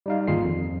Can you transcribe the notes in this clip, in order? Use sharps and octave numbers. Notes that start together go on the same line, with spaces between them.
G3 D#4 F5
G#1 D#2 F4 G#4 C7
F2